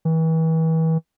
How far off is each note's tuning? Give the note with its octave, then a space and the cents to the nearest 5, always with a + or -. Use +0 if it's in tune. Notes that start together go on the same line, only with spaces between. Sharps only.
E3 -35